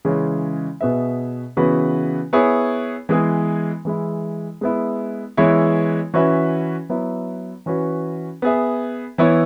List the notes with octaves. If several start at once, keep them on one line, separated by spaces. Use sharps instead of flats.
C#3 E3 G#3 C#4
B2 B3 G#4 B4 E5
C#3 E3 B3 F#4 B4
B3 E4 G#4 C#5
E3 G#3 B3 G#4
E3 G#3 E4
G#3 B3 E4
E3 G#3 B3 E4 C#5
E3 C#4 F#4 B4 E5
F#3 B3 E4
E3 C#4 F#4 B4
B3 G#4 E5
E3 B3 E4 C#5